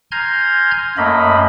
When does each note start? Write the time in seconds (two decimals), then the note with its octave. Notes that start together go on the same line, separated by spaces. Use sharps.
0.12 G#5 A#5 C6 F6 G6 G#6
0.97 F#2 A3 A#3 D#5 B5